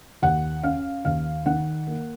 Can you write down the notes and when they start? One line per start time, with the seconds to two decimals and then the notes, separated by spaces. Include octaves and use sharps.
0.22 D#2 F#5
0.64 C#4 F5
1.05 D#2 F5
1.46 D#3 F#5
1.87 A#3